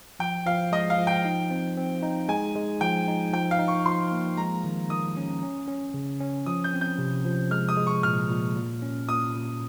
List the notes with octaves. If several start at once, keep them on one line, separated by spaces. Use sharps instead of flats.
F3 G5
F3 F5
G#3 D#5
F5
F3
G5
D#4
C4
C4
D#4
G#3 G#5
G#3
F3 G5
D#4
F3 G5
F5
D#4
C#6
F3 C6
A#3
G#3 A#5
D#3
D#3 D#6
C#4
C#4
C#4
C#3
C#4
F3 D#6
G6
C4
G6
C3
F3
G#3 F6
D#6
G#3
C#6
A#2 F6
A#2
A#2
C#4
A#2 D#6
A#2